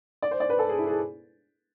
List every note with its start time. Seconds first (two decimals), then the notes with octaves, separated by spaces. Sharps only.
0.22 D5
0.31 C5
0.40 D5
0.50 B4
0.59 A4
0.69 G#4
0.79 E4
0.87 G#4